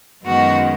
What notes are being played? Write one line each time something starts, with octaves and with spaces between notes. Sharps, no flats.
F#2 D#3 G#3 B3 F#4